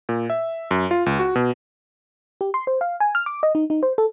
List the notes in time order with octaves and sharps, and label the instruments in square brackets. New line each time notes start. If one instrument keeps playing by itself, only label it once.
[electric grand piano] A#2
E5
F#2
F4
C#2
F#4
B2
[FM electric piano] G4
C6
C5
F5
G#5
F6
D6
D#5
D#4
D#4
C5
A4